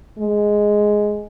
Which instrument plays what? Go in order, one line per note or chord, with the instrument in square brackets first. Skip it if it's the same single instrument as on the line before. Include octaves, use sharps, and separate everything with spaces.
[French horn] G#3